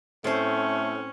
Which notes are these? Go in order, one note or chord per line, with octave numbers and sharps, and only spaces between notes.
A2 A3 C4 C#4 C5